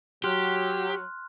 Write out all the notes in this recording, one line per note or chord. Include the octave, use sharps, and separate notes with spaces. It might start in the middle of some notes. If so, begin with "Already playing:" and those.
F#3 G4 C6 F6 F#6